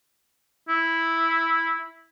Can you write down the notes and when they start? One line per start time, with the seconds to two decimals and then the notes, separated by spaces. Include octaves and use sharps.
0.69 E4